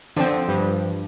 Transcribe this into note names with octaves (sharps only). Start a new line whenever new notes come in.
D3 F3 C4
G2